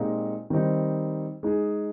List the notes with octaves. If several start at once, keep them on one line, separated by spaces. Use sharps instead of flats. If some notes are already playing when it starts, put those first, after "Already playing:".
Already playing: A#2 G#3 C4 D#4 G4
D#3 G3 C4 D#4
G#3 D#4 G#4